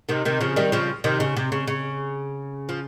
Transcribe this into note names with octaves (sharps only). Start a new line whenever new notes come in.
C3 D#3
C3 D#3
C#3 F3
D#3 G3
C#3 F3
C3 D#3
C#3
C3
C#3
C#3
F3